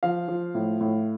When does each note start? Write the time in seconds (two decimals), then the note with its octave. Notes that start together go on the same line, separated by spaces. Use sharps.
0.03 F3 F5
0.28 F3
0.55 A2
0.81 A2